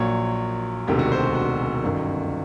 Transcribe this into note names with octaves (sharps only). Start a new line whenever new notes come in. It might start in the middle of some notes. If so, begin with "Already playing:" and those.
Already playing: A#1 A#2 F#3 C#5
E1 D2 C3 D#3 G4
F#4
C5
F#4
F#4
G1 F#2 D#3